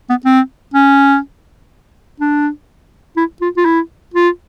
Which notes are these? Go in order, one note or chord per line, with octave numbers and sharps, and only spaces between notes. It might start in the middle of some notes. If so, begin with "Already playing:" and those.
B3
C4
C#4
D4
E4
F4
F4
E4
F4